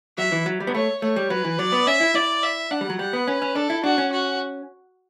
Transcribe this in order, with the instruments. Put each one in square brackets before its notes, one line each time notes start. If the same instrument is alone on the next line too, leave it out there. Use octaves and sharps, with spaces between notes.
[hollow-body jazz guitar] F#3 [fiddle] E5
[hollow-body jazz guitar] E3
F#3
G3
B3
[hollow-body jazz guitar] A3 [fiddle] C#5
[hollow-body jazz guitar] A3 [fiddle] C#5
[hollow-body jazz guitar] G3
[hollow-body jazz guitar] F#3 [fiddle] B4
[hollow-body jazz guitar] E3
[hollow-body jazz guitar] F#3 [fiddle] D5
[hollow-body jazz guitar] B3
[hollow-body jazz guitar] C#4 [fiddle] E5
[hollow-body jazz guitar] E4
[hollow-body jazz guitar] E4 [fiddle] D5
[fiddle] E5
[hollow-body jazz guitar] D4 [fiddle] F#5
[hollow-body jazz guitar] G3
F#3
[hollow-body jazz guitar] G3 [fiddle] F#5
[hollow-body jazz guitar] B3
[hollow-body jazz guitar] C#4 [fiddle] B4
[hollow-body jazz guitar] C#4
[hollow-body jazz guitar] D4 [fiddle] A4
[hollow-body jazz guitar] E4
[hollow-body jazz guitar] D4 [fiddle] F#4
[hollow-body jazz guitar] C#4
[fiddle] F#4